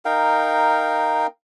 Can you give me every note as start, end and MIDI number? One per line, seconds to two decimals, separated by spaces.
0.05 1.27 63
0.05 1.27 70
0.05 1.27 77
0.05 1.27 79